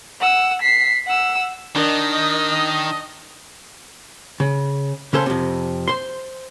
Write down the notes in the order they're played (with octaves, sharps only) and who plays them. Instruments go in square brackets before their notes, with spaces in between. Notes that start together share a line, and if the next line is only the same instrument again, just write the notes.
[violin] F#5 E6
B6 C7
F#5 E6
[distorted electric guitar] D#3 [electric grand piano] D4 A#4 [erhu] D#5
[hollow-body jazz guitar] C#3
C#3 C#4 A4 C5
F2 C3
C5 C6